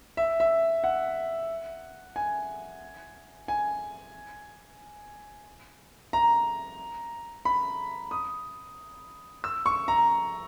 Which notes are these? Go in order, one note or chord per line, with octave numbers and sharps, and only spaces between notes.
E5
E5
F#5
G#5
G#5
A#5
B5
D#6
E6
C#6
A#5